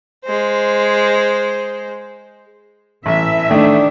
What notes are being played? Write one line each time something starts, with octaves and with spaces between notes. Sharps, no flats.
G#3 C5
A1 E3 E5
D#3 A3 D4